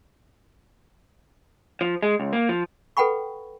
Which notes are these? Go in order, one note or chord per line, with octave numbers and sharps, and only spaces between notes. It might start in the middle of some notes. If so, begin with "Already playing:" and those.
F3
G#3
C#2
A#3
F3
A4 B4 F#5 G5 B5 C#6